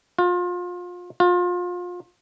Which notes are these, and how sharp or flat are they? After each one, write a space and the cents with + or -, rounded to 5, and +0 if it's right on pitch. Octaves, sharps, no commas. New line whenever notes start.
F4 +30
F4 +30